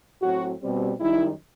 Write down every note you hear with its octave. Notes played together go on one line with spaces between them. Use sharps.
A2 F#3 C4 F#4
B2 G3 C4
F#2 D#3 G3 D#4 E4